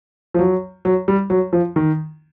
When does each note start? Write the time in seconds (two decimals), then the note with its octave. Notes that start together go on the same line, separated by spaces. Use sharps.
0.34 F3
0.39 F#3
0.85 F#3
1.08 G3
1.30 F#3
1.53 F3
1.76 D#3